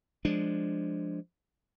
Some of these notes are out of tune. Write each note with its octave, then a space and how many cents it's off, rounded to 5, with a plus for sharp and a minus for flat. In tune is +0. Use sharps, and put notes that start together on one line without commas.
F3 +0 G#3 +0 D4 +0